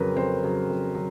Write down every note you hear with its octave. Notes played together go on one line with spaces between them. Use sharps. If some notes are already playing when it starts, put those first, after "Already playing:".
Already playing: F2 C#3 F#3 A#4 B4
F2 C5
C#3 F#3
F2
F#3